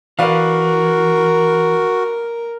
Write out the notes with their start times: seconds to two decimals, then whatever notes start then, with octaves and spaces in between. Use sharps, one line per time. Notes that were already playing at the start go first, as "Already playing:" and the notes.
0.19 E3 F#4 A#4 B4 D5 F5